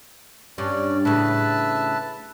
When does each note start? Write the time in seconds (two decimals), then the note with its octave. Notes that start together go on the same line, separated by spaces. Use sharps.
0.58 G2 G3 C#4 D5
1.05 A2 C#3 B4 E5 A5